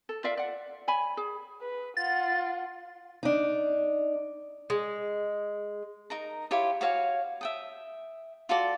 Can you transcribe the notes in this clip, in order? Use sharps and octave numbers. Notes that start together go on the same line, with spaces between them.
A4
F4 D5 E5 F5
D5 F#5
C#5 G#5 B5
G#4
B4
F4 F#5 A6
D4 D#4
G#3
D#4 A#4 A#5
E4 F4 G4 C#5
F#4 C#5 F5 G#5
E5 G5 D#6
F4 F#4 A4 D5